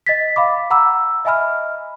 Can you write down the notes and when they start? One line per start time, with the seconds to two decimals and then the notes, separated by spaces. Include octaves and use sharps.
0.06 D#5 A6 B6
0.36 F5 B5 D6
0.70 F#5 A#5 B5 D6 E6
1.25 D#5 E5 G#5 B5 F6